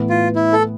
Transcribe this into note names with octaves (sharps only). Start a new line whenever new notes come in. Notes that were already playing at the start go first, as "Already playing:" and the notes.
Already playing: A2 E3 B3
F4
E4
A4